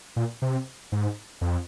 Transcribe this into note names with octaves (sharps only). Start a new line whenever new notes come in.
A#2
C3
G#2
F2